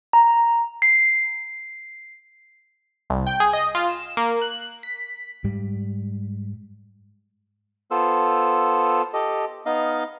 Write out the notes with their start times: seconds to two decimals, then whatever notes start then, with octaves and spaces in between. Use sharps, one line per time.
0.13 A#5
0.82 C7
3.10 C2
3.27 G5
3.40 G#4
3.53 D#5
3.75 F4
3.88 E7
4.17 A#3
4.42 F#6
4.83 B6
5.44 G#2 G3
7.91 B3 F4 A4 C5 E6
9.14 G4 A4 D#5
9.66 B3 D#4 D#5 F5